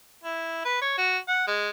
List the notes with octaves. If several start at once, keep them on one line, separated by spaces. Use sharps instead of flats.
E4
B4
C#5
F#4
F#5
G#3